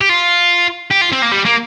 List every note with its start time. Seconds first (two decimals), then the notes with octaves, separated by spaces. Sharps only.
0.01 G4
0.09 F4
0.91 G4
1.01 F4
1.12 C4
1.22 A#3
1.31 G3
1.45 A#3